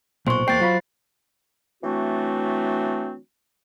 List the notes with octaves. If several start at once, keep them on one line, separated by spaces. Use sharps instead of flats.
B1 A#2 C5 C6 C#6
E2 A#3 C5 G5 A6 C7
F#3 F4 B5
E3 F#3 A3 C4 D4 F#4